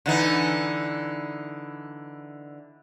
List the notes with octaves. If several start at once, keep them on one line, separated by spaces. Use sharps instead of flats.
D3 E3 D#4